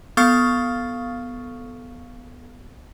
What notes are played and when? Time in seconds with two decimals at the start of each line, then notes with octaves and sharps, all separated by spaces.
0.17 B3 A4 F5 C#6 F6 C7